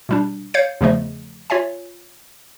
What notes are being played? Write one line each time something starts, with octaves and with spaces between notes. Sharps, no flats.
B2 G3 D4
C#5 F5 G6 G#6 C#7
E2 C#3 F3 A3 D#5
F4 C#5 E5 G#5